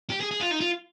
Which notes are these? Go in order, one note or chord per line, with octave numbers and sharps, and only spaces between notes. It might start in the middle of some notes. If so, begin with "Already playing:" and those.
G4
G#4
G#4
F4
D#4
F4